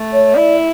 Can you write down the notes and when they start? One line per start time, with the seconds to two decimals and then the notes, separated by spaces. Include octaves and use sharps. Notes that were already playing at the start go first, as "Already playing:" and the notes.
Already playing: A3
0.12 C#5
0.35 E4 D5